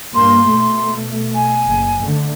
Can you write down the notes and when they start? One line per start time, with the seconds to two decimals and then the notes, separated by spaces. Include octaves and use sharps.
0.14 G2 A#3 C6
0.47 B2 A3
1.34 G#5
1.65 F#1
2.02 D3 A3